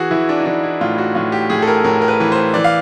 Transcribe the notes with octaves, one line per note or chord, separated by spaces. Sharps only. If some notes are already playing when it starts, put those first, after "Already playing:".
Already playing: E3 F#4 G#4
E3 E4
D4
D#4
E3 D4
E4
A2 F4
F#4
A2 F4
G4
A2 G#4
A4
A#4
A2 A#4
A#4
B4
E3
C5
E3 D5
F5